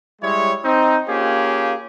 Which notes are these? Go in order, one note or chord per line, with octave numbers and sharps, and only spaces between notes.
G3 G#3 E4 C#5
C4 D#4
A#3 C#4 F4 G4 G#4